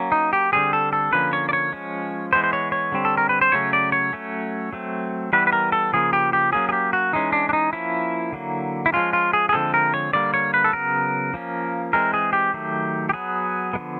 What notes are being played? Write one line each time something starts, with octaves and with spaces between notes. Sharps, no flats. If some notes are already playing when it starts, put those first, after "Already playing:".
Already playing: F#3 A#3 C#4
D#4
G4
D3 G3 C4 G#4
A4
A4
D3 F3 A#3 C#4 B4
C#5
D5
C#5
F3 G#3 C#4
E3 G#3 B3 C5
C5
C#5
C#5
D3 G3 C4
A4
A#4
B4
C5
C#3 F#3 A3 C#4 C#5
D5
C#5
F#3 A3 C#4
F#3 A3 C4
E3 G3 B3 B4
B4
A#4
A4
C#3 F3 A#3 G#4
G4
G4
F#3 A#3 C#4 G#4
G#4
G4
F#4
E3 G#3 C#4 D#4
D4
D4
D#4
F3 A#3 C#4 E4
D3 F#3 A#3
E4
F3 G#3 C#4 F4
F4
G#4
G#4
D3 F3 G#3 C4 A4
A#4
C#5
D3 G3 A#3 D5
C#5
B4
A4
C#3 F#3 B3 A#4
F3 A#3 C#4
E3 G#3 C4 A#4
G#4
G4
D#3 F#3 A3
G4
F#3 B3 G#4
D3 F3 G#3 B3